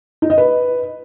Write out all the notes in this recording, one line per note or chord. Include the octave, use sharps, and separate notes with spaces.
D#4
D#5
B4